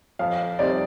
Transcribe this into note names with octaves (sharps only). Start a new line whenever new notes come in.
F2 F5
C3 G3 C4 D#4 D5